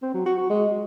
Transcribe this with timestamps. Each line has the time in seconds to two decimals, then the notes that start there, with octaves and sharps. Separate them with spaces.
0.02 C4
0.14 F#3
0.26 F#4
0.38 F#4
0.50 G#3